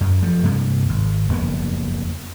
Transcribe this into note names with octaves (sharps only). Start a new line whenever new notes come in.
F#2
F3 A3
G2 C3
G#1
F#1 F2 A#3 B3